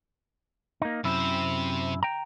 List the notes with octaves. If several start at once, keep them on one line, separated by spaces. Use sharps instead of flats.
A#3 D#4
F#2 C3 E4 C5
G5 A#5